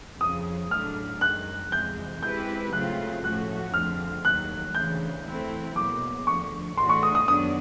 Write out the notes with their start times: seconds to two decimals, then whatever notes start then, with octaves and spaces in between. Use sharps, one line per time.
0.20 F2 C#3 F3 D#6
0.71 A2 F#3 A3 D4 F6
1.21 F#2 D#3 G#3 F#6
1.72 F2 C3 E3 G#3 G6
2.23 G#3 C4 E4 G4 B4 G6
2.73 C#3 F#3 A3 C4 F4 F#6
3.24 A2 F3 A3 C#4 F#4 F#6
3.74 F2 D3 F3 A3 C4 F6
4.25 D#2 D#3 F#3 F#6
4.74 D2 C#3 E3 G6
5.25 E3 A3 C4 E4
5.76 B2 F#3 A#3 D6
6.27 D2 D3 F3 C#6
6.77 A2 E3 A3 D4 F#4 C6
6.89 C#6
7.03 D#6
7.15 D#6
7.27 F#2 D#3 F#3 B3 D4 D#6